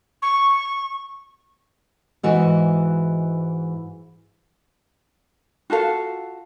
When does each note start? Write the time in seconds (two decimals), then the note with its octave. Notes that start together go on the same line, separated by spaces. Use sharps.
0.22 C#6
2.23 G#2 E3 F#4 D#5
5.70 F4 F#4 A4 F5